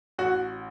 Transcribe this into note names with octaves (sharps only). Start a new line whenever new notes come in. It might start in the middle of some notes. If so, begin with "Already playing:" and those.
A1 F#4